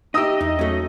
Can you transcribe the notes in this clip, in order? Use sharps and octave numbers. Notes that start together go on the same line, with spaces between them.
D#4 G4 D#5 E5 D#6 E6
E2 D#4
F#3 A3 C#4